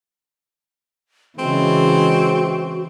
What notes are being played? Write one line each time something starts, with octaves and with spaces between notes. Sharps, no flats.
C#3 E3 G#3 C4 F#4